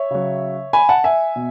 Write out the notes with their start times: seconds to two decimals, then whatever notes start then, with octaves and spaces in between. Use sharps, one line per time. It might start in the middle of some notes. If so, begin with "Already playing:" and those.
Already playing: C#5 E5
0.11 C#3 F#3
0.73 G#5 B5
0.89 F#5 A5
1.04 E5 G#5
1.36 B2